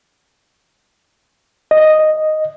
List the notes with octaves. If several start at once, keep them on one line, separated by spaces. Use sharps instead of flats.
D#5